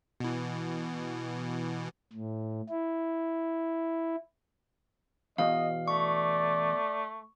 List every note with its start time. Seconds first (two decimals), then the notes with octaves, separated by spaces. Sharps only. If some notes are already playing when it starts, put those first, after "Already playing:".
0.20 B2 E3
2.13 A2
2.70 E4
5.38 E2 B2 D#5 F5
5.88 A3 D5 C#6